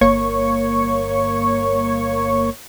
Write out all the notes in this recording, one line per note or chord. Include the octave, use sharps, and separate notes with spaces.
G1 A#3 C#5 C#6